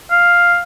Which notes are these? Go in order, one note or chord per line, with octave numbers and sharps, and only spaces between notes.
F5